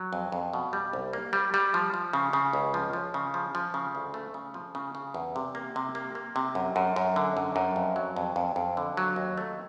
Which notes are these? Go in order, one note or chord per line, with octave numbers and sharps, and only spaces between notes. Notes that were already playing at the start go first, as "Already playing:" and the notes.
Already playing: F#3
F2
F2
B2
G3
C2
A#3
G3
G3
F3
F3
C#3
C#3
C#2
F3
F3
C#3
F3
F3
C#3
D2
A3
C#3
F3
C#3
C#3
E2
C3
A#3
C3
A#3
A#3
C3
F#2
F#2
F#2
D3
F#2
F#2
F2
F#3
F2
F2
F2
D3
F#3
D#2
A3